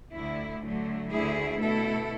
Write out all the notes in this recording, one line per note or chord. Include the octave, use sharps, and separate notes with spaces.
D2 D3 A3 E4
D3 F#3 A3
D2 D3 A3 E4 G#4
B2 A3 E4 A4